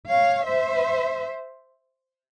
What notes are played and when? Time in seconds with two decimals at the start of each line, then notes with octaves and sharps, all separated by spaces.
0.08 C#5 F5
0.45 C5 E5